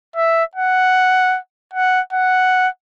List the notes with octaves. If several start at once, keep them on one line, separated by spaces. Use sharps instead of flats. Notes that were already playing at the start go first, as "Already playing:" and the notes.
E5
F#5
F#5
F#5